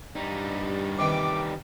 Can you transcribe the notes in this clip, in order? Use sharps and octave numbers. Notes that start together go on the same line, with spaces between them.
G2 G3 D#4
C3 D#3 E3 D6